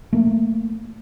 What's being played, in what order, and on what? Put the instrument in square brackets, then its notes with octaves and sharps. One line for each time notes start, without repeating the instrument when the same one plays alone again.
[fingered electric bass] A3 A#3